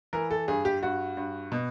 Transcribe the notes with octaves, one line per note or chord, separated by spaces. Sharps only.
E3 A#4
A4
G2 G#4
G4
G2 F#4
G2
B2